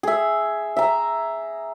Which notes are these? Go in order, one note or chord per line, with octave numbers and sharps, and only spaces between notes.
G#4 E5
E5 A#5